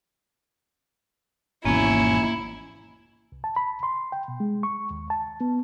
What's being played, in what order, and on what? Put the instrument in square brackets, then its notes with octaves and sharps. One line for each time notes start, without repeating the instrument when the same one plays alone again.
[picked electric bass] G#1 E2 B2 [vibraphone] A#3 [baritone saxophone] C#4 [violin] E4
[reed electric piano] C2
A5
B5
C6
G5
B2
G#3
C#6
D#2
A5
B3